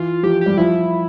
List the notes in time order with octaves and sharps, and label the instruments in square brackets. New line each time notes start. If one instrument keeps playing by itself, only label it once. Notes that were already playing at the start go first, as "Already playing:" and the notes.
Already playing: [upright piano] E3 [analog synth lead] F4
[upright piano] F3 [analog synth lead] G4
[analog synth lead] G4
[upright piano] G3
[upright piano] F3 [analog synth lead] E4